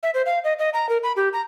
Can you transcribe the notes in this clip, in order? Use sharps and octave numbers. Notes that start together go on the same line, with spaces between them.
E5
C5
F5
D#5
D#5
A#5
A#4
B5
G4
A#5